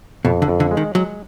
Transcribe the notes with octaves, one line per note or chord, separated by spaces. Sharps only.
F2 B2
D3
F2
D3
G#3
D#3
F#3 G#3